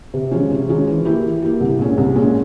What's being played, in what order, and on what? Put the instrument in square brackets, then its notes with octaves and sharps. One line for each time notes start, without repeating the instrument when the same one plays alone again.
[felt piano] C3
F3 G#3 C#4
C3
F3 G#3 C#4
E3
A#3 E4 G4
E3
A#3 E4 G4
C2
A#2 G#3 C#4
C2
A#2 G#3 C#4